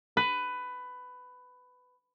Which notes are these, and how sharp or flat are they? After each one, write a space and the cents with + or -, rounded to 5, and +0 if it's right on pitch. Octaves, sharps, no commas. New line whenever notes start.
B4 +15